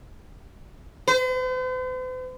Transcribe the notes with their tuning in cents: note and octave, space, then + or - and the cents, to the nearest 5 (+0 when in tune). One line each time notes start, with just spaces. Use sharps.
C5 -45